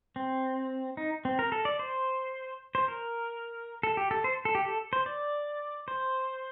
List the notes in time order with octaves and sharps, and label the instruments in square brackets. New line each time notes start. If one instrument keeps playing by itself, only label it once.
[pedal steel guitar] C4
D#4
C4
A#4
A4
D5
C5
C5
A#4
A4
G4
A4
C5
A4
G4
A4
C5
D5
C5